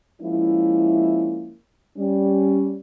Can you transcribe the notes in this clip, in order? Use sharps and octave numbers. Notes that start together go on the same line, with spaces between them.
F3 G#3 A#3 C#4 E4
G3 C#4